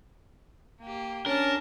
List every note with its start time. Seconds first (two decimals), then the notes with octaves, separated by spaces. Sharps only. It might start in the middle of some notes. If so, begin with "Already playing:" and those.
0.81 A#3 G4
1.26 C#4 D4 A#4 A5